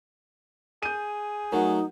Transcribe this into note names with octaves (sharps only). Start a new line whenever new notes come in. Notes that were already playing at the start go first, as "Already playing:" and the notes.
G#4 G6 D#7
F#3 A3 D#4 A#4 F#5